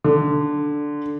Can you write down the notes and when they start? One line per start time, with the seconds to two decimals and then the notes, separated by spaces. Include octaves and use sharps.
0.04 D3